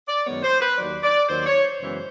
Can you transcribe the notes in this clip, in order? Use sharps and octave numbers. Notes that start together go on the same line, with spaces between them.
D5
F#2 D#3 G#3 B3 C#5
C5
B4
D#2 D#3 F#3 D5
D5
D#2 D#3 F#3 C5
D5
C#5
C5
F#2 C#3 E3 G#3 B3